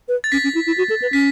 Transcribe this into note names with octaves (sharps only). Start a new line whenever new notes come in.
B4
A6
C#4 B6
C#4
E4
E4
F#4
A4
B4
C#4 B6